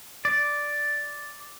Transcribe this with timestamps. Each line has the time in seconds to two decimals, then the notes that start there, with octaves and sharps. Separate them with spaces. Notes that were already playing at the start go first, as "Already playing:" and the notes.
0.25 D5